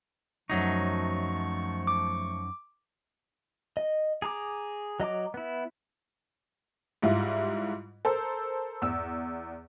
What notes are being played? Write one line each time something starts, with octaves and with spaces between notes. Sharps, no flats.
F#2 F3 F#3 A3 D#4 C#6
D6
D#5
G#4 A#5 D6
F#3 D#5 A#5 D6
B3 E4
G#2 G3 E4 F4
A4 A#4 C5
E2 E6